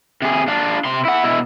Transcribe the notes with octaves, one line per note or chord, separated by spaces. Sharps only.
C3 G#4
D4 F4
C3 C6
E4 F#5
B2 E4